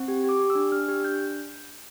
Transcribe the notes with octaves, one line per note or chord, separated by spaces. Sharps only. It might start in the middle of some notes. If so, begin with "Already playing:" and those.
Already playing: C4
G4
G4 D6
G4
E6
D4
D4 F6
G4
D4 G6